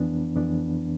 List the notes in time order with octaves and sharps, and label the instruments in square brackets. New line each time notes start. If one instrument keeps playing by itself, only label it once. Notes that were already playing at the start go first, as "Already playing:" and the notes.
Already playing: [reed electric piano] F2 E3 B3 D4
F2 E3 B3 D4